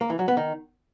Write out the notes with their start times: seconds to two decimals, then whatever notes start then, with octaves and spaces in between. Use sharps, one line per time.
0.01 A#3
0.10 E3
0.19 F#3
0.28 B3
0.37 D#3